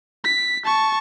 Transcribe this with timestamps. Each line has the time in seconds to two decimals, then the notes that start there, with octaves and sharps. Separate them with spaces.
0.25 B6
0.64 A5 C#6